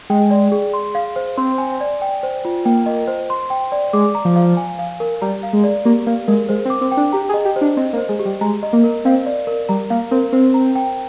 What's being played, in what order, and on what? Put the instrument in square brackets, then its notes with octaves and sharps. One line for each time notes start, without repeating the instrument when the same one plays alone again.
[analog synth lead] G#3 [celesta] G5
[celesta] D5
G#4
C6
F5
C5
[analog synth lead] C4 [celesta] C6
[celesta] G#5
D5
G5
C5
F4
[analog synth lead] A#3 [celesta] G5
[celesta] D#5
C5
C6
G5
D5
[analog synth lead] G#3 [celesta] D6
[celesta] A#5
[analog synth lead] F3
[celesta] F5
G#5
F5
A#4
[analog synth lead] G3 [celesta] A#5
[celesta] F5
[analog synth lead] G#3
[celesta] D5
[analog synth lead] A#3 [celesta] G4
[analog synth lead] A#3 [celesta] F5
[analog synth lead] G#3 [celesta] A#4
[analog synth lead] G#3 [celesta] C5
[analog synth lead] C4
[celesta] D6
[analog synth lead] C4
[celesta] G5
[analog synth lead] D4
[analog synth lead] G4 [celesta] A#5
[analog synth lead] G#4
[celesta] D#5
[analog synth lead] G4
[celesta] C5
[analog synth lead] D4
[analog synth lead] C4 [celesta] D#5
[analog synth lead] A#3
[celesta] C5
[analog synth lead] G#3
[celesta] G4
[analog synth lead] G3
[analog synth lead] G#3 [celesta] A#5
[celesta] D#5
[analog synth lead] A#3
[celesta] A#4
[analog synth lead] C4 [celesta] F5
[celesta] D5
A#4
[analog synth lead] G3 [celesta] A#5
[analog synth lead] A#3 [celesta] F5
[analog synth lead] C4 [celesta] A#4
[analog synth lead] C4 [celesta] C5
[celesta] A#5
G5